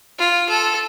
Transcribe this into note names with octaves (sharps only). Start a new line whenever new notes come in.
F4
A4